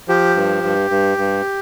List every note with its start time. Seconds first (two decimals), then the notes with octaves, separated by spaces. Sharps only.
0.08 F3 G4
0.36 G2
0.63 G2
0.90 G2
1.18 G2